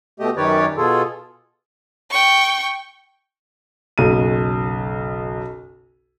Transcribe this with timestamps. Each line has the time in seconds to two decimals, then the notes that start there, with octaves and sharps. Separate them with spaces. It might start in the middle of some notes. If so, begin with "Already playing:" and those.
0.20 B2 A3 G4 D#5
0.37 F#2 D#3 G4 B4 C#5 D5
0.77 B2 F4 G#4 A4
2.11 G5 C#6
3.98 F#1 B1 D#7